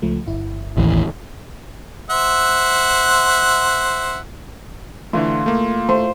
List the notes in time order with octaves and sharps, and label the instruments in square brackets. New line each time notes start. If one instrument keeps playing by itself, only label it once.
[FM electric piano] C#2 F3 A3
G1 E4
[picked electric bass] A1 D#2 E3
[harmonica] C5 E5 F#5
[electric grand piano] D3 E3 A3 [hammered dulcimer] F4
[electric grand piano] A3 A#3
[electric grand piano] A3 [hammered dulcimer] C5